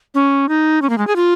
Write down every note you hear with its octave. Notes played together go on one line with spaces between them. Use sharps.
C#4
D#4
C#4
A#3
G#3
G#4
F4